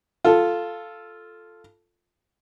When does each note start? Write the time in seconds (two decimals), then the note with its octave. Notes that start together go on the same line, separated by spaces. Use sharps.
0.25 F4 A4